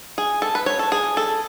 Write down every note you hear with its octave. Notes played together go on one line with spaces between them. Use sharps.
G#4
A4
B4
C#5
A4
G#4
A4